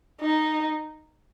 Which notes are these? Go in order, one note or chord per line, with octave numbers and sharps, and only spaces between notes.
D#4